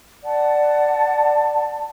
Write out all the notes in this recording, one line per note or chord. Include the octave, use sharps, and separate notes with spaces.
D5 F#5 A5